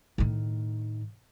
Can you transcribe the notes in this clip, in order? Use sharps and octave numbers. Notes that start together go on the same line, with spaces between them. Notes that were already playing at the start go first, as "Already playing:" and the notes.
A2 D#3